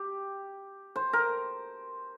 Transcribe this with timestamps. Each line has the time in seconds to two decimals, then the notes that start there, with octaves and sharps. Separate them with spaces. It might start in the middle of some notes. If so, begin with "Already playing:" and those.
Already playing: G4
0.96 C5
1.13 A#4